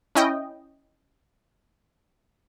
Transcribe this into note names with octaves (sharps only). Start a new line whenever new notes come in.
C#4 E4 D#5 G5